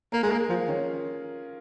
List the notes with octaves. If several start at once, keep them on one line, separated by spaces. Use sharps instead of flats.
A#3 A#4
G#3 A#4
A#3 G#4
F3 F4
D#3 C#4